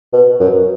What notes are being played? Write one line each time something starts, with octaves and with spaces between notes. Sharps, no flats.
B2
F#2